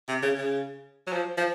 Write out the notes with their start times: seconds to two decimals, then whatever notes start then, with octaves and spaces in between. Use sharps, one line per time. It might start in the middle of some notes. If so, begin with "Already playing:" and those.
0.09 C3
0.23 C#3
0.37 C#3
1.07 F#3
1.13 F3
1.37 F3